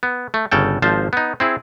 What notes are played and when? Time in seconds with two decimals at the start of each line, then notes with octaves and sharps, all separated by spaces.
0.03 B3
0.34 A3
0.52 G1 C#3 A4 G5
0.82 G#1 F3 C5 A5
1.13 B3 D#4
1.40 C4 E4 G#4